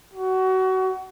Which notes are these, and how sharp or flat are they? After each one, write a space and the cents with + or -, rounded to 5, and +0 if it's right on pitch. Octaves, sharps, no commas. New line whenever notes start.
F#4 +25